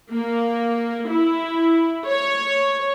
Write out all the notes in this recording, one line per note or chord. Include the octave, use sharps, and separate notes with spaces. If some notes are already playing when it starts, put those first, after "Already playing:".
A#3
E4
C#5